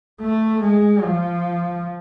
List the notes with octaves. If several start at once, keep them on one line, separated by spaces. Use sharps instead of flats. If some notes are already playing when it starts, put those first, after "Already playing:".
A3
G#3
F3